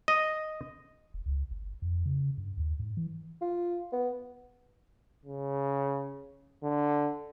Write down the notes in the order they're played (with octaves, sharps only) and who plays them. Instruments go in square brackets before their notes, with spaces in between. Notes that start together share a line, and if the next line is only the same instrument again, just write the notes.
[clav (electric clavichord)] D#5
[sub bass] E1
C#2
G1
F2
C#3
G2
D#2
G#2
E3
[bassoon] F4
B3
[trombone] C#3
D3